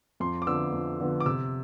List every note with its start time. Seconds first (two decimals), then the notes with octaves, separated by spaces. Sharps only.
0.20 F2 C6
0.42 D6
0.47 D3 F3 B3 E6
0.73 F2
1.00 D3 F3 B3
1.20 D6
1.26 C3 E6